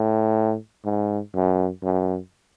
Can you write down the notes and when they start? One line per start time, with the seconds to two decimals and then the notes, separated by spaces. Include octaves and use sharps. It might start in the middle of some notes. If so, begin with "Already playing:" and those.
Already playing: A2
0.85 G#2
1.34 F#2
1.83 F#2